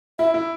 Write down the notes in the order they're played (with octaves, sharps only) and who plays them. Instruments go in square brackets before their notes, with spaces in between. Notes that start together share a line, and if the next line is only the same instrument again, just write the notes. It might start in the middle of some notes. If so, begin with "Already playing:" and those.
[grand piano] E4 [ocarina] E5
[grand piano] E4